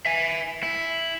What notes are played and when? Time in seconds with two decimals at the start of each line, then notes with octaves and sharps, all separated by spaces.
0.06 E5 G#5
0.63 E4